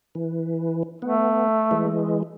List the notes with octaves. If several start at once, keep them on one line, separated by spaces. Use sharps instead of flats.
E3
A3 B3
E3 G#3